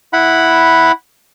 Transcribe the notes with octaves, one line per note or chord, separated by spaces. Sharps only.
E4 F#5 B5